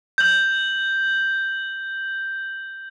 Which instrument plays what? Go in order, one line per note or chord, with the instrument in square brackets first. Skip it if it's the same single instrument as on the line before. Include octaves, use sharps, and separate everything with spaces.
[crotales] G6 F#7